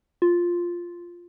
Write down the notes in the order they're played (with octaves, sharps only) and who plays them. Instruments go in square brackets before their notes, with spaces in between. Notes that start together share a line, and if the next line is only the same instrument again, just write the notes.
[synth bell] F4